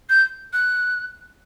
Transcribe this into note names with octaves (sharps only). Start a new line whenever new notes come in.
G6
F#6